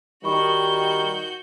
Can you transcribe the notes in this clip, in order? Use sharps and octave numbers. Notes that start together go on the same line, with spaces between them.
D#3 G3 F#4 B5 C#6 G6